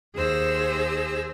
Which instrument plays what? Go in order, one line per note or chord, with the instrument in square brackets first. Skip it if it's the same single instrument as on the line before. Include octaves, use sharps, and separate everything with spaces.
[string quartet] D#2 G#4 C5 E6 A#6